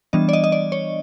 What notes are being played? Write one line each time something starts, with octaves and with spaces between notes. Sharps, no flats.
E3 G3 B3 D4 D#5
D5
D#5
D#5
D5
C#5